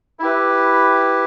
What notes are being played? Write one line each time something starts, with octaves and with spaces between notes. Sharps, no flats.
E4 G4 B4